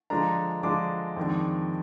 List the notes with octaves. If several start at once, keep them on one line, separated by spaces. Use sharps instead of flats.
D3 F3 G#3 D4 A#5
D3 F3 G#3 D4 D6
F2 D#3 G#3 D4